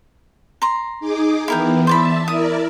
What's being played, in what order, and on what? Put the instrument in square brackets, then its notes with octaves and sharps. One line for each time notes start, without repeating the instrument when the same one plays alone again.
[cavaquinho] A#5 C6
[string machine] D#4 G#4 D6
[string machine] E3 B3 [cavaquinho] E4 A#4 G5
[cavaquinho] C5 D5 B5 [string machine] E5 A5
[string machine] E4 A#4 D5 [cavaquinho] D#6